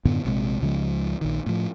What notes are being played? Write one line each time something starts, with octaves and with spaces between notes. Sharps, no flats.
F#2 A2 D3 B3
A#1 C3 G#3
C#2 C#3 F3 G#3
A#1 D#3
A2 F3